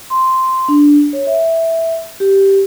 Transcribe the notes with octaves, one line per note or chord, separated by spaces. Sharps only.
C6
D4
C#5
E5
G4